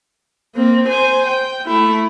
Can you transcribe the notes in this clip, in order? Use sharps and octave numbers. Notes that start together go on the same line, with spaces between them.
A#3 C4
C5 G#5
G5
A3 E4